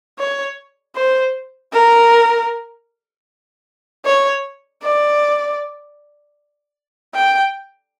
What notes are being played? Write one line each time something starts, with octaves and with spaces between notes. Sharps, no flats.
C#5
C5
A#4
C#5
D5
G5